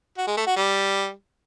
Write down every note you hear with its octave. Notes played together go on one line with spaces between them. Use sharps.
F#4
G#3
A3
F#4
G3